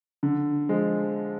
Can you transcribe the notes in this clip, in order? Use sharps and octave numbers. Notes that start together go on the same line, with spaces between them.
D3
F3 G#3